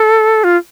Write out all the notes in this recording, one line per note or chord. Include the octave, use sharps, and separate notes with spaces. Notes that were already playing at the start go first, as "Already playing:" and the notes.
Already playing: A4
F4